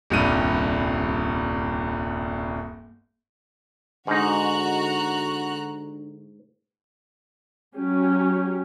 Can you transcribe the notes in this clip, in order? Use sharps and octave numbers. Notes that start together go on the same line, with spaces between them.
D#1 C2 G2 D#7
G#2 D3 D#4 F#4 A#5 F#6
F#3 C#4 G4